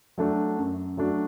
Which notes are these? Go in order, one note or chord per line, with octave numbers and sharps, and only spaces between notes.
F#3 A3 D4 F#4
F#2
F#3 A3 D4 F#4